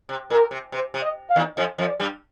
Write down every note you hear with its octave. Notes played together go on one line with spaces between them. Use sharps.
C3
A#2 A#4
C3
C3 C5
C3
D#5
F5
D#2 D#3
F2 F3 D#5
F2 F3
D5
G2 G3